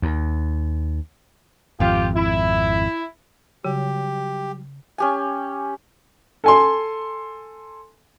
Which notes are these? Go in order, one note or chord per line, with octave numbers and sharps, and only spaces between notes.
D#2
G#1 F2 F4 G4
E4
C#3 F#3 G3 G4
C#4 G4 G#5
A4 G#5 C6